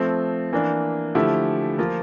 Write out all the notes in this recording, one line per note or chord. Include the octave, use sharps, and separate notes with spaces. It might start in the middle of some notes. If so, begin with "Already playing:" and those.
Already playing: F3 A3 C4
E3 A#3 D4
D3 F3 A3 E4 G4
F3 A#3 F4